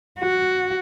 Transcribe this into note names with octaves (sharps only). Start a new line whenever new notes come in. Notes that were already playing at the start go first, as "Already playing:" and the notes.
F#4